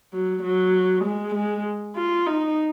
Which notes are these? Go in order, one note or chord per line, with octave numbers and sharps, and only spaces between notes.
F#3
F#3
G#3
G#3
F4
D#4